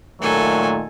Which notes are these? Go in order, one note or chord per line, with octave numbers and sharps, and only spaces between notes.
A#2 D#3 F#3 A3 A4 G#5